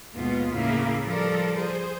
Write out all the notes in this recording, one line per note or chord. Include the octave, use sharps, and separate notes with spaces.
D#2 G#2 B2 G#3 B3 F4
A2 C#3 A#3 E4 F5
F3 G3 F4 A4 A#4 D5
G#4 C5